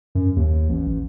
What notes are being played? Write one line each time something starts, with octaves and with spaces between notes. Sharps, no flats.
F#2
D#2
A1
A1